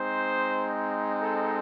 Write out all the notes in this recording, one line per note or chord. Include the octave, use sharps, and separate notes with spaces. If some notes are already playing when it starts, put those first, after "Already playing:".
Already playing: G#3 C4 D#4 C5
A4